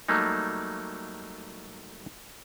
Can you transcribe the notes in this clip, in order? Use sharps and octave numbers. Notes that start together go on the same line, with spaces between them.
F#3 G3 A3 A#3 D#4